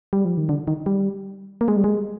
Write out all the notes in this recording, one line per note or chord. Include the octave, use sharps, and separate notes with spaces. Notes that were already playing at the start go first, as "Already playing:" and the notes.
G3
F3
D#3
D3
D#3
G3
A#3
G#3
G3
G#3